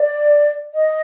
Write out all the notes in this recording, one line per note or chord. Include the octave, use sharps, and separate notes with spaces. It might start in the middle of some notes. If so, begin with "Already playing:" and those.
Already playing: D5
D#5